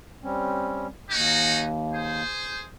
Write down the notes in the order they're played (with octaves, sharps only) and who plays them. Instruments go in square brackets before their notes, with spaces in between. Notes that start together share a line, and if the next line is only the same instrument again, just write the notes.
[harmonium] G3 C4 C#4
[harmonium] D#2 [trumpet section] C#4 D#4 F#4
[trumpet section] G#4 C5